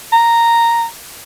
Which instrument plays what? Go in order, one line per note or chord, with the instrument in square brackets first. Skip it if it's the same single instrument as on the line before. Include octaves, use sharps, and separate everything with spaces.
[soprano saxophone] A#5